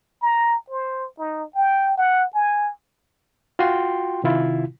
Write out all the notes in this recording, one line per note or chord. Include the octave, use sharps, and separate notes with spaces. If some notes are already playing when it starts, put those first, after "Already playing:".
A#5
C5
D#4
G5
F#5
G#5
F4 F#4 G5 C6
C3 D#3 E4 F4